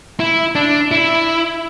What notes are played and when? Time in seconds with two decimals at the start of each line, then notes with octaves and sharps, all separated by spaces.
0.20 E4
0.55 D4
0.91 E4